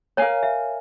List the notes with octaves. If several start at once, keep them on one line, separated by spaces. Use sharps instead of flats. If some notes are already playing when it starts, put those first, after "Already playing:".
A#4 C#5 F5 G#5
E5